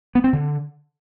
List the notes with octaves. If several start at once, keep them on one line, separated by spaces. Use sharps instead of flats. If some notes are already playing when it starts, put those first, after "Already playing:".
B3
C4
D3